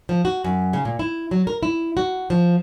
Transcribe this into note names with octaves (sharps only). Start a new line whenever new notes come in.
F3
F#4
F#2
C#3
A#2
E4
F#3
A#4
E4
F#4
F3